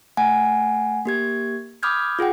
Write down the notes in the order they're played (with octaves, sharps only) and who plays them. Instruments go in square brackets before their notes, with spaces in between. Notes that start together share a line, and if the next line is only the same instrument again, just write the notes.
[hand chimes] A3 F#5 G#5
A#3 G4 G#6
B5 D6 D#6 F6 G6 G#6
F4 G#4 F#5 G5